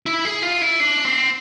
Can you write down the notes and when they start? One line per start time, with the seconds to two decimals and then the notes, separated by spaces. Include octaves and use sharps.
0.06 E4
0.25 G#4
0.43 F4
0.62 E4
0.80 D4
1.05 C4